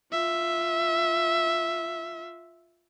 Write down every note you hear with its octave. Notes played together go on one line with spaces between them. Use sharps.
F4 E5